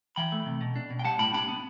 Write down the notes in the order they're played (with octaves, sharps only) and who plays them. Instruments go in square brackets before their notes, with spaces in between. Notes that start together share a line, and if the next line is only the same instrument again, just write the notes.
[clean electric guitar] E3 G5 B5
A3
C3
B2
D4
B2
G5
G3 F#5 A5
A2 G5 B5
D4 G5 B5
B3